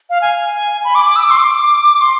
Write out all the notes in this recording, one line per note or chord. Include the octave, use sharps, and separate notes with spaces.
F5
G#5
B5
D6
D6
E6
D6
C6
D6
C6